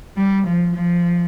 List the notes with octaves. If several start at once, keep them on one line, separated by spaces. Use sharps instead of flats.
G3
F3
F3